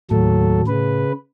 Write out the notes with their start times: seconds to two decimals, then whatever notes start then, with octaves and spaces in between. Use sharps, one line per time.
0.11 D#2 A2 F#3 A4
0.67 C#3 B4